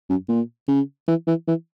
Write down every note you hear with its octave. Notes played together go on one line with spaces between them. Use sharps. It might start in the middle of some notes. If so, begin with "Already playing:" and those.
F#2
A#2
C#3
E3
E3
E3